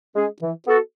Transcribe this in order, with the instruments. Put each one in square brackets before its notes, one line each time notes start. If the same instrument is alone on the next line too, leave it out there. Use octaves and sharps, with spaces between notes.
[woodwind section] G#3 C#4 G#4
E3
B3 F#4 A4